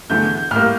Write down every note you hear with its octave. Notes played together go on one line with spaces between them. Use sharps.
E2 D3 A3 G6
G6
G6
A2 G3 A#3 F6